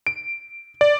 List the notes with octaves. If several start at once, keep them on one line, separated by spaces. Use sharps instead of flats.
D7
D5